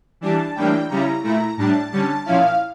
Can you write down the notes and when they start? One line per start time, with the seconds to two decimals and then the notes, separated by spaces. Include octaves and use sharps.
0.21 E3 G3 D4 A5
0.55 A2 E3 G3 A#3 D4 G5
0.89 C#3 G3 C#4 E4 A#5
1.23 A#2 A3 E4 A#5
1.57 A2 G3 D4 A5
1.91 D3 G3 C#4 A5
2.25 A#2 F3 C#4 E4 F5